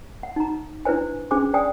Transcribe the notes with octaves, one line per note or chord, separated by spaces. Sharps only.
F#5
D#4 A#5
D4 E4 B4 C5 G#5
C#4 D4 G#4 C5 G#5 D6
C5 D5 G5 G#5 D#6